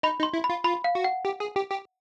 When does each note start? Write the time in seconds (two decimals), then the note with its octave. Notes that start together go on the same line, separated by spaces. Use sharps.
0.03 D#4 B5
0.19 D#4
0.23 C6
0.33 E4
0.44 B5
0.50 F4
0.64 F4 B5
0.84 F5
0.95 F#4
1.04 F#5
1.25 G4
1.40 G#4
1.56 G4
1.71 G4